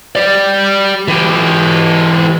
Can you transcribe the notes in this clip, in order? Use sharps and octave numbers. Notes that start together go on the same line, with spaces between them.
G4 D5
E3 G4